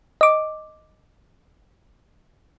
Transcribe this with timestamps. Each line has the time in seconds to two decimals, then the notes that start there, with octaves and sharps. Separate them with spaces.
0.21 D#5 D6